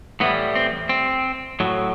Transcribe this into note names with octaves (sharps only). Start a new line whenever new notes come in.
A2 E3 G3 B3
C4
C4
A2 F#3